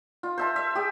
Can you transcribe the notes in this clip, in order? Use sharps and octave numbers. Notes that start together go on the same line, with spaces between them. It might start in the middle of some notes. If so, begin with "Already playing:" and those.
F4
C5 E5 A5
E5
G4 G#4